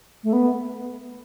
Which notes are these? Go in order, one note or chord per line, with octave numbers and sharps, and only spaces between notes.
A3
B3